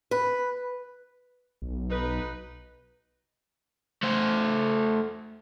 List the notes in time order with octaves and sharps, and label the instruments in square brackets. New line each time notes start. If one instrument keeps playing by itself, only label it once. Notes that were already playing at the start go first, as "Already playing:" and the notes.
[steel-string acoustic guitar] B4
[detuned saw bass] B1
[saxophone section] D#4 B4
[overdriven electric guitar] A3 C5